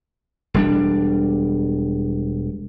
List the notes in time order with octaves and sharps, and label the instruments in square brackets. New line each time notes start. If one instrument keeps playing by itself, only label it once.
[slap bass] E1 G3 D4